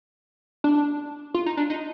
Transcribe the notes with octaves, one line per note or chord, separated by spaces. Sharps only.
D4
F4
D#4
D4
D#4